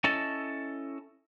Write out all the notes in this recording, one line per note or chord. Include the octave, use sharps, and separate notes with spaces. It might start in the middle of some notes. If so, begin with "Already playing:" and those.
C#4 E4 A4 D#5 A5